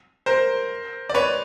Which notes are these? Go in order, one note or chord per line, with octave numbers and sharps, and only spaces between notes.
A#4 C5
D5
B4 C#5